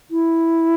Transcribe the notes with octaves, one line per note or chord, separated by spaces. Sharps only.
E4